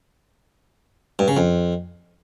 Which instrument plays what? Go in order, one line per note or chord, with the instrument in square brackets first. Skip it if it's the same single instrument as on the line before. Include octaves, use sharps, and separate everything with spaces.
[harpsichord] G2
C#3
F2